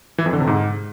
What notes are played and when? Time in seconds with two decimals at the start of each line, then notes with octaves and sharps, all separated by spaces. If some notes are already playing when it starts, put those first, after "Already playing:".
0.18 E3
0.26 F2
0.33 D3
0.40 C3
0.47 G#2